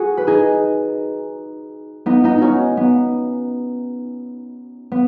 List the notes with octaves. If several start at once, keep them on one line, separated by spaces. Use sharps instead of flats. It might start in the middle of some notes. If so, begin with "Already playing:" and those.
Already playing: F#4 G#4
B4
D#4 G#4
B3 D#4
B3 D#4
C#4 D#4 F#4
B3
B3